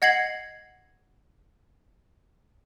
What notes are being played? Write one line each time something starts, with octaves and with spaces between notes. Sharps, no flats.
D#5 F#5 G#6 A#6 C7 F#7